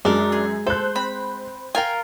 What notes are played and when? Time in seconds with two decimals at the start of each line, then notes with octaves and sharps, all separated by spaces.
0.05 F#2 G#3 D4 A#4
0.32 G#4
0.67 A4 C5 F#6
0.96 C4 B5
1.75 F4 A#4 G5 G#5